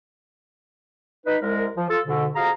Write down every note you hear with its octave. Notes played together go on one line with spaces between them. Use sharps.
D#4 B4
C2 G#3 A#4
F3
F4 A4
G#2 B2 D3
F2 F#4 G#4 F5 A#5